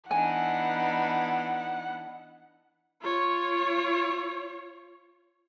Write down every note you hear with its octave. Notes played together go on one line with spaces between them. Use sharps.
E3 B3 D4 D#4 F#5 G#5
F4 C#5